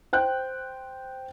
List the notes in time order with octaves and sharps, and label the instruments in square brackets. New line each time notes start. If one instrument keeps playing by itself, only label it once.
[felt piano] C5 G5 F#6